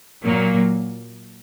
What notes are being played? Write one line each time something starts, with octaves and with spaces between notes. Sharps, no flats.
A#2 F#3 A#3